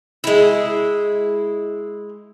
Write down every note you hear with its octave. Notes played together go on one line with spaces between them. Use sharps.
G#3 E4